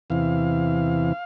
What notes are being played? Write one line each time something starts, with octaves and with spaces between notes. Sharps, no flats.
E2 C3 E3 F5